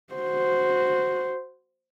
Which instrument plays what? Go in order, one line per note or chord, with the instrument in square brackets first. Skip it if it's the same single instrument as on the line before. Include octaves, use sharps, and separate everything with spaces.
[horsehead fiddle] F#4 C5